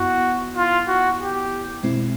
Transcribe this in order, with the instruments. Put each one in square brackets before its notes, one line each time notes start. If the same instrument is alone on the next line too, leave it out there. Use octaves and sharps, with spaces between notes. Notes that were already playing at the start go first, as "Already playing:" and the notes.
Already playing: [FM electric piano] F#2 B3 E4 [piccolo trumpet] F#4
[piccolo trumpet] F4
F#4
G4
[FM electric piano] B2 G#3 C4 E4